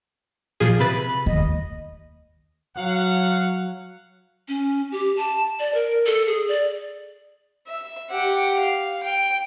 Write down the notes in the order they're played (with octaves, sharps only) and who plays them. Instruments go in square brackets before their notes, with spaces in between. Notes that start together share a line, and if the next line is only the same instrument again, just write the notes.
[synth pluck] A#2 F3 G#4
[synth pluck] C3 B4 A6 [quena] B5
[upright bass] D#2 [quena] D#5
[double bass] F#3 [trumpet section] F5 F#5
[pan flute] C#4
G4
A5
D5
A#4
A4
G#4
D5
[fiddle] E5
G4 F#5
F5
G5